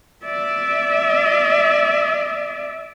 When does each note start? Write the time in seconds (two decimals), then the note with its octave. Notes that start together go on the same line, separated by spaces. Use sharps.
0.26 D5 E5